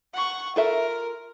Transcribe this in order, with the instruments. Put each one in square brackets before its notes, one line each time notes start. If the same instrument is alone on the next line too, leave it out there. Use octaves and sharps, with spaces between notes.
[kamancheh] F#5 C#6
[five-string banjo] F4 A4 E5 [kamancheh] A#4